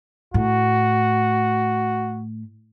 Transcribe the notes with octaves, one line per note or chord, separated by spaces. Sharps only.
A2 F#4